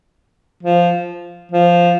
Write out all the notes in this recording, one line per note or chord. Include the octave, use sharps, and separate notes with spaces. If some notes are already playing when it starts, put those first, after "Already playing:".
F3
F3